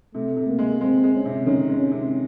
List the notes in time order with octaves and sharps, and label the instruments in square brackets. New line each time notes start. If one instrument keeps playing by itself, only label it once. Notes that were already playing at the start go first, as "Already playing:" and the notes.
[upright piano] C3 [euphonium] A3
[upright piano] C3
[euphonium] A#3
[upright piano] G#3
[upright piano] G#3 [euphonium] C4
[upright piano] G#3
[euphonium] C#4
[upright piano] C3
[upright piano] D#3 [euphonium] C#4
[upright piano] G#3
[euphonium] C#4
[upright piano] C3